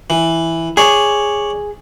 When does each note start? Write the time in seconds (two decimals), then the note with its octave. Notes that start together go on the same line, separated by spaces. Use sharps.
0.10 E3
0.77 G#4 C#5 D5